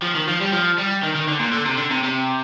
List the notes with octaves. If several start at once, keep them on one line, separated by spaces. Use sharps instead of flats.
F3
D#3
F3
G3
F3
G3
D#3
D#3
D3
A#2
D3
C3
D3
C3
C3